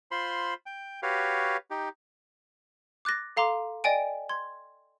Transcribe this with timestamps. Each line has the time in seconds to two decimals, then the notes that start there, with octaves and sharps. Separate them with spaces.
0.11 F4 C5 B5 C6
0.66 G5
1.03 F#4 G4 B4 C#5 F5
1.71 D#4 G4
3.05 D6 F#6 A6 A#6
3.37 A4 F5 A#5 C6 D6
3.84 D5 D#5 G5 G#5 D7
4.29 C6 G#6